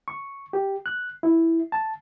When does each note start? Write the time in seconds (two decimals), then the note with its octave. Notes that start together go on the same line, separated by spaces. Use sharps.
0.08 C#6
0.53 G4
0.86 F#6
1.23 E4
1.72 A5